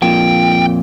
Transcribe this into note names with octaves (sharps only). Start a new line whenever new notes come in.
F2 A#2 G5